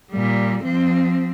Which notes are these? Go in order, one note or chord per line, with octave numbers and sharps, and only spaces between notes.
A#2 G3
F3 C4